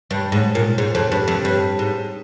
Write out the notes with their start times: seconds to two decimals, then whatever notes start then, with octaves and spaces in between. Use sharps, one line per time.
0.11 G2
0.32 G#2
0.55 A#2
0.78 G#2
0.95 F2
1.12 G2
1.28 F2
1.45 G2
1.79 G#2